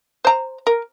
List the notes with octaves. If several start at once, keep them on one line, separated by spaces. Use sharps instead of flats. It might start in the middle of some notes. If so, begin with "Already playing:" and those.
C5 A#5
A#4